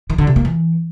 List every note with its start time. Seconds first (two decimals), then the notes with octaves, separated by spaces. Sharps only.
0.10 D#3
0.18 D3
0.27 C3
0.36 A#3
0.45 E3